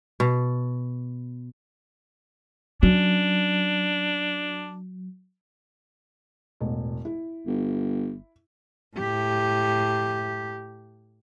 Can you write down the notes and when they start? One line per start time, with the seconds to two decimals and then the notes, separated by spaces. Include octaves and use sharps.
0.20 B2
2.83 F#3 C#4 D4
6.60 E1 A1
7.05 E4
7.47 G1
8.97 A2 G4